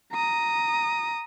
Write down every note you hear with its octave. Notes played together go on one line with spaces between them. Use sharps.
A#5 D#6